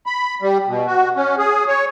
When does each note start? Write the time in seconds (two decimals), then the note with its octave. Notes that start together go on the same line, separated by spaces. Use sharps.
0.06 B5
0.42 G3
0.68 B2
0.87 F#4
1.16 C#4
1.38 G#4
1.68 C#5